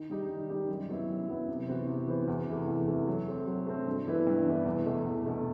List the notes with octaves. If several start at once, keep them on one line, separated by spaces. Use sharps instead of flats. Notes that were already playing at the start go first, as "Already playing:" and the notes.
Already playing: D#3
G3 D#4 G4
D#3
G3 D#4 G4
F#2
F#3 B3 E4
F#2
F#3 B3 E4
C3
E3 B3 F#4 C5
C3
E3 B3 F#4 C5
E2
C3 E3 A3
E2
C3 E3 A3
F#3
A3 C4
F#3
A3 C4
G2
E3 B3 E4 B4
G2
E3 B3 E4 B4
E2
B2 A3
E2
B2 A3